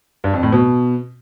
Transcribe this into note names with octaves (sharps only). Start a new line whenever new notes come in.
G2
F2
A2
B2